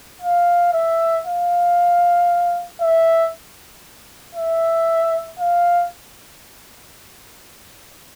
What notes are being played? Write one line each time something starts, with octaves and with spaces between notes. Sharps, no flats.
F5
E5
F5
E5
E5
F5